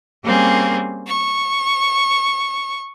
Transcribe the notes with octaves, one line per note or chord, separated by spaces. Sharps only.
G3 A#3 C4 C#4 G#4
C#6